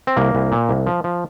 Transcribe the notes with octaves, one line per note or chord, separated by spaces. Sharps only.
C4
C2 A#3
C2
A#2
C2
F3
F3